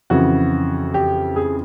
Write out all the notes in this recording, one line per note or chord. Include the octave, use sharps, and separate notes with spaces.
F2 C#3 E3 F#4
G4
G#4